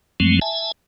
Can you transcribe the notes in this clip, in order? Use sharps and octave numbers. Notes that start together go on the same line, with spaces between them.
F#2 F3 F#3 G#3 A3 C4
E5 G#5 A5